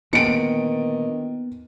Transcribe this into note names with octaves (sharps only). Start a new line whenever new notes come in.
A#2 D3 D#3 B3 C#7 D7